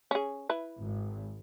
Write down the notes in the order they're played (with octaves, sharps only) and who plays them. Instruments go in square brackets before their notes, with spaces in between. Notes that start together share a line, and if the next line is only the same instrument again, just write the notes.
[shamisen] C#4 G#4
E4 B4
[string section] G#1